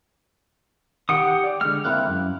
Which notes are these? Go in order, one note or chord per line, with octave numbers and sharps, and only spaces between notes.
D#3 G4 F#5 D#6
D5 G5 D6
D3 G#3 F6
A#3 C4 E4 F#6
F#2